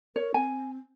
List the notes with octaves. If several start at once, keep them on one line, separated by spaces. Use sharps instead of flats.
A#4 C#5
C4 G#5